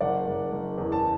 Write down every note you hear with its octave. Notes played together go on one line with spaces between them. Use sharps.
F#1 D5 F#5
F#1
F#1
E2
A5